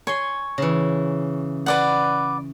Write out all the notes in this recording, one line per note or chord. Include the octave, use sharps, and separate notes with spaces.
C#5 G#5 C6
C#3 E3
B4 D5 F#5